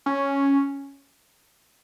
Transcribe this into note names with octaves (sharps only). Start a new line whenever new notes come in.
C#4